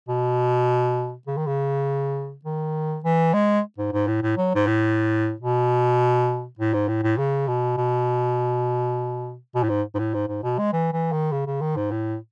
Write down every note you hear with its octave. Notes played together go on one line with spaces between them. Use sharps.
B2
C#3
D#3
C#3
D#3
E3
G#3
G#2
G#2
A2
A2
F#3
G#2
A2
B2
A2
G#2
A2
A2
C#3
B2
B2
B2
A2
G#2
G#2
A2
G#2
G#2
B2
G#3
E3
E3
D#3
C#3
C#3
D#3
G#2
A2